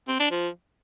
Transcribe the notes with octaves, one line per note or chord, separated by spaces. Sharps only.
C4
D4
F3